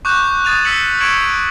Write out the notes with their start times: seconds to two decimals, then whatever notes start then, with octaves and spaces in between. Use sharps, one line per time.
0.05 C#6 D6 F#6 G6 E7
0.45 D#6 G#6 A6 D#7 F7
0.64 E6 B6 C#7 F#7
1.00 C#6 G#6 C#7 D7 E7 F#7